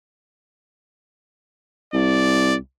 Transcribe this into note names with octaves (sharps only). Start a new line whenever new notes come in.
C2 D5